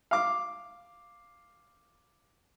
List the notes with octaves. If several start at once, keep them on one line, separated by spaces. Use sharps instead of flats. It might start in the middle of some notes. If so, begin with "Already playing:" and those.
F5 D6